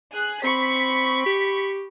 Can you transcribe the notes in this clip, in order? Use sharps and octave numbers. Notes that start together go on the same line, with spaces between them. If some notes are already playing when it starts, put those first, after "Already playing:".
G#4 F#6
C4 B5 C#6 B6
G4